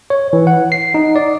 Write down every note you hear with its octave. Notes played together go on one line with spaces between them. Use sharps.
C#5
E3
F#5
C7
D#4
D5